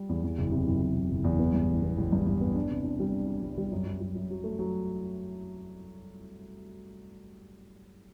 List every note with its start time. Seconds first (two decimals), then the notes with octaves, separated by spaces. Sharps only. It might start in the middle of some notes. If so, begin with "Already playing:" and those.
Already playing: G3
0.09 E2
0.23 E2
0.38 F#1
0.52 C3
0.67 F#1
0.82 F#1
0.96 F#1
1.11 F#1
1.24 E2
1.39 B3
1.53 G2
1.69 A1
1.83 B3
1.97 A1
2.12 G2
2.27 G2
2.41 B3
2.55 D4
2.71 C3
2.84 D4
3.00 G3
3.13 D4
3.28 D4
3.42 C2
3.58 G3
3.72 F#2
3.86 F#2
4.01 F#2
4.15 F#2
4.30 F#3
4.44 A3
4.59 F#3